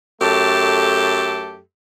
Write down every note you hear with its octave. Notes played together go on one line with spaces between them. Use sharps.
F#2 A3 G4 A4 A5